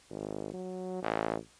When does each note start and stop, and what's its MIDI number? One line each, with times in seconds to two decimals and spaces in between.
0.11 0.52 32
0.54 1.01 54
1.02 1.36 33